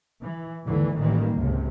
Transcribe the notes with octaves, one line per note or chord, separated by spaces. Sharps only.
E3
D#2 G#2 D3 E3
A1 D#3 E3 G3 A#3
G#1 C#2 F#2 C3